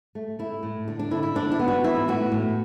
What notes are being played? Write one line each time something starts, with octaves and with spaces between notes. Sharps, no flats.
A3
A3 E4
A2
D3 D4
D4
D3 E4
E4
D3 D4
E4
B3
F#4
E3 E4
A2 F#4
A2